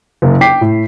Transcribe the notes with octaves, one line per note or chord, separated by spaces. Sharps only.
F#1 A#3
G5 D6 B6 C7
A2